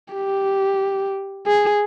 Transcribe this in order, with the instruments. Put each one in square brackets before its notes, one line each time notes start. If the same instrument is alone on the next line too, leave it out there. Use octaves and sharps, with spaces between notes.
[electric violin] G4
G#4